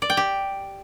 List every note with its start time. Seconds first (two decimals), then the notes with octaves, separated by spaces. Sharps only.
0.02 D5
0.10 G5
0.17 G4